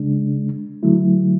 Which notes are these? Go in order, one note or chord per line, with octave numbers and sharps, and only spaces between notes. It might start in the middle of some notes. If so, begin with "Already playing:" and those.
Already playing: C#3 G#3 D4
D3 F#3 A3 E4